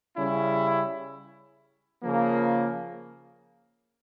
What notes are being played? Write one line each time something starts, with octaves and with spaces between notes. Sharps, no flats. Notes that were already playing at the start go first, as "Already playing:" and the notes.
C#3 G3 C#4 E4
C#3 F3 A#3